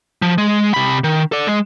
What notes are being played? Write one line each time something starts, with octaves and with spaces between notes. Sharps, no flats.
F3
G#3
C3 B5
D#3
A4 D5
G#3